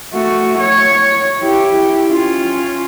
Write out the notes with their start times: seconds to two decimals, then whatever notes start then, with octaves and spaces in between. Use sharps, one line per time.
0.14 A3 F#4
0.60 C#5
1.40 E4 G4
2.09 C#4 F4